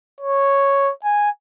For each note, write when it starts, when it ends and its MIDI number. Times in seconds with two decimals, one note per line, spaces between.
0.21 0.91 73
1.04 1.30 80